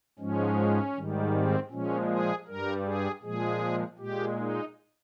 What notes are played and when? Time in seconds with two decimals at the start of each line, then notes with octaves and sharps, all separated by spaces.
0.19 G#2 F3 G#3 C#4
0.95 G#2 D#3 G3
1.33 C4
1.71 A#2 F3 G#3 C#4
2.09 G#4
2.47 G2 G3 A#4
2.85 G#4
3.22 A#2 F3 G#3 G#4
3.99 A#2 G#3 G4
4.38 D#4